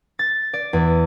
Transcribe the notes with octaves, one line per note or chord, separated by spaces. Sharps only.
A6
D5
E2